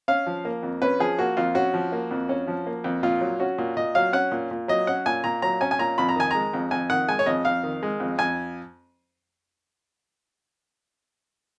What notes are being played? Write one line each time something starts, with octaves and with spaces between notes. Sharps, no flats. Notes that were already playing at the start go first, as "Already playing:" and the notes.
C#4 F5
F3
A#3
F2
C#4 B4
F3 G#4
A#3 F#4
F2 F4
C#4 F#4
F3
A#3
F2
C#4
F3
A#3
F2
A#2 F4
F#3
C#4 F#4
A#2
A#2 D#5
F#3 F5
C#4 F#5
A#2
A#2
F#3 D#5
C#4 F#5
A#2 G#5
A#2 A#5
F#3 A#5
C#4 G#5
G#5
A#2 A#5
F2 B5
A#5
D#3 G#5
G#3 A#5
F2
F2 G#5
D#3 F#5
G#3 G#5
C#5
F2 D#5
F2 F5
D#3
G#3
F2
F2 G#5